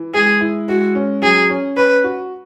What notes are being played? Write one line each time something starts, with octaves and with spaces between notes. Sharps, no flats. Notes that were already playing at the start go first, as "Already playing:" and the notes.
Already playing: E3
G#3 G#4
E4
G#3 F#4
C#4
F#3 G#4
C#4
C#4 B4
F#4